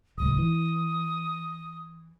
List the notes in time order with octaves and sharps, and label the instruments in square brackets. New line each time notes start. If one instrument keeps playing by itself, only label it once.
[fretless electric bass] D1 C#2 [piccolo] D#6
[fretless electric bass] E3